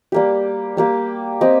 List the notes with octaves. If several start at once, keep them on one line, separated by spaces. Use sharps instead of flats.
G3 A#3 G4
G3 A#3 G4
C4 G4 D#5